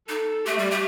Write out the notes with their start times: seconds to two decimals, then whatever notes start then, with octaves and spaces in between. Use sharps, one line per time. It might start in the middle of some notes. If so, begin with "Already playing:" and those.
0.09 D#4 A4
0.46 A3 G4
0.58 G3
0.71 A3